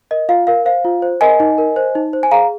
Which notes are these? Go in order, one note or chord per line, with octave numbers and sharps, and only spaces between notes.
A#4 D#5
F4 F5
A#4 F5
C5 F5
F4
C5
A#4 D#5 G#5
D#4
A#4
C5
D#4
C5
G#5
G#4 F5 A#5